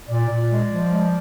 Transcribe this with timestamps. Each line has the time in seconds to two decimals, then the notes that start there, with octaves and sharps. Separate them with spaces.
0.09 A#2 D5
0.29 A#2
0.49 G#3
0.69 F3
0.89 G#3